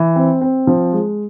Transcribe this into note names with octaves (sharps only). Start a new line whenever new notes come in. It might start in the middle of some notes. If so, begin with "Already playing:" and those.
Already playing: E3
C4
C4
F3
G#3